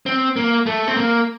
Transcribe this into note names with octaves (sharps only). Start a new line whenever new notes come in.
C4
A#3
A3
C4
A#3